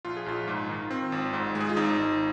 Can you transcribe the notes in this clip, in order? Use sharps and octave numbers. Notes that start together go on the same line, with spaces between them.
A#1 F4
G#4
A#1 F4
G#2
D#3
C4
G#1
G#2
G#3
G#4
F4
G#1 D#4
G#1